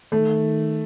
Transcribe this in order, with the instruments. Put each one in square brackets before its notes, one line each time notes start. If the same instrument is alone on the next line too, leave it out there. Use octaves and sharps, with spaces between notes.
[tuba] D#3 [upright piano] A3